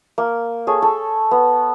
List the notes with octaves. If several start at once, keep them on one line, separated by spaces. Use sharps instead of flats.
A#3
G#4 A4 C#5
A4
B3